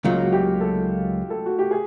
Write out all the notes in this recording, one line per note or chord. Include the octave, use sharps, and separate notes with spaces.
C#2 C#3 F#3 A#3 F4
F#4
G4
A4
A4
F#4
G4
G#4